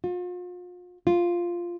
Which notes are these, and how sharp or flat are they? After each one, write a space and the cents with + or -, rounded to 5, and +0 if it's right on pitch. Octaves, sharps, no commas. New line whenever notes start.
F4 +40
F4 -5